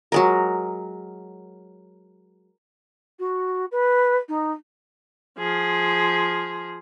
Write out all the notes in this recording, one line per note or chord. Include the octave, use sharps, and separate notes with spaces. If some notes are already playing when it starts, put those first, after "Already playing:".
F#3 G#3 A#4
F#4
B4
D#4
F3 G#4